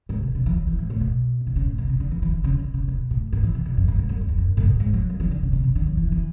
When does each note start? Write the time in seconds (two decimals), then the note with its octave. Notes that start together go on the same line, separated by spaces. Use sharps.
0.09 G#2
0.23 B2
0.35 D3
0.46 E3
0.57 F#3
0.67 E3
0.79 G#2
0.90 A2
1.01 B2
1.47 D3
1.56 C#3
1.67 A2
1.78 B2
1.89 C#3
2.00 D3
2.11 E3
2.22 E3
2.33 D3
2.44 C#3
2.59 B2
2.74 C#3
2.88 B2
3.11 A2
3.33 G#2
3.44 E3
3.55 B2
3.65 E2
3.77 F#2
3.88 G#2
3.99 G#2
4.09 F#2
4.21 F#2
4.29 E2
4.38 F#2
4.57 A2
4.66 G#2
4.80 G#2
4.94 F#3
5.09 F#3
5.20 E3
5.31 D3
5.43 C#3
5.53 B2
5.64 C#3
5.75 D3
5.87 F#3
5.97 E3
6.12 E3